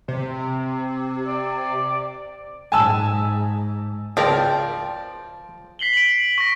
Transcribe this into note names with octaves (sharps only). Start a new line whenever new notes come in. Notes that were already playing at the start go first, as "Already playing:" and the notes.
C3
D5
G#2 G#5 A5 E6
G#1 C#2 F3 A#4 D5 G5 A5
B6 C7 F#7 G7
D7 F#7
C#6 A#6